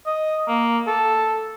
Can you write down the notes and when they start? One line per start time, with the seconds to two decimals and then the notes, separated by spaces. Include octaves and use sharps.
0.06 D#5
0.47 A#3
0.87 A4